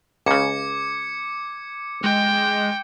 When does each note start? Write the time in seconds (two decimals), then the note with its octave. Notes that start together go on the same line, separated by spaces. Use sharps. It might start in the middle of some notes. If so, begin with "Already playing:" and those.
0.26 C#2 C#3 D6 G#6 C#7
2.04 G#3 G5